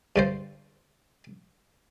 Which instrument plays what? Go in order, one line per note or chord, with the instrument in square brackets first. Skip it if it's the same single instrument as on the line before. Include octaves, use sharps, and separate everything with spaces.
[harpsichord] G2 D3 C5